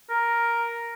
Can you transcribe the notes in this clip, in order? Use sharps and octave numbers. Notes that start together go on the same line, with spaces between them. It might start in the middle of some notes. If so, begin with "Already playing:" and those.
A#4